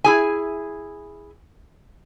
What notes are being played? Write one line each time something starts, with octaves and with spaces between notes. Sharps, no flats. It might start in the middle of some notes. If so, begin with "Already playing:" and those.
E4 G#4 G#5